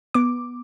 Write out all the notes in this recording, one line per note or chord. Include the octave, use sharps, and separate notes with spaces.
B3 D6